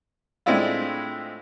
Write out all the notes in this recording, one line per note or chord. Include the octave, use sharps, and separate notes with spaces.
A2 G#3 C4 D4 E4 F4